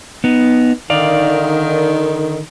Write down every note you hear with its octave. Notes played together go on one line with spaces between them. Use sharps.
B3 D#4
D3 D#3 D5 F5